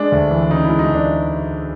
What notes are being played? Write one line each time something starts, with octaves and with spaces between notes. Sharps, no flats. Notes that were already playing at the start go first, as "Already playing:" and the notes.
Already playing: G#3 D4
D2
E3
C#3 D#4
G#3 E4
D#4
D2 D4